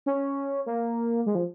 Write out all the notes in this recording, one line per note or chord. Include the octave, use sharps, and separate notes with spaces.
C#4
A#3
G#3
F3